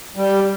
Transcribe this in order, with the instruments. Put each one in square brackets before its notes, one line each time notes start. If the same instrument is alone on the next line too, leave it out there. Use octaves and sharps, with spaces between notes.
[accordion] G3